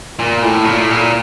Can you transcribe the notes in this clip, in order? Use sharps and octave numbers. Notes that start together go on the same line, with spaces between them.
A#2
A2
A#2
A2
A#2